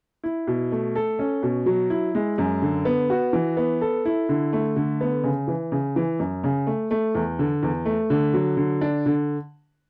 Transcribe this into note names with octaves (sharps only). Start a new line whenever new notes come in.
E4
B2
A3
A4
C#4
B2
F#3
E4
G#3
F#2
D3
B3
F#4
E3
B3
A4
E4
D3
A3
D3
B3
C#3
E3
C#3
E3
F#2
C#3
A3
A3
E2
D3
E2
A3
D3
F#3
D3
D4
D3